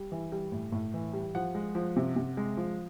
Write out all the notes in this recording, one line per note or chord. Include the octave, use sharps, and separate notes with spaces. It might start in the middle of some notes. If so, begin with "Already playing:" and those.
Already playing: G3
E3
G3
A2
A2
E3
G3
F3 F#5
G#3
F3
C3
C3
G#3
F3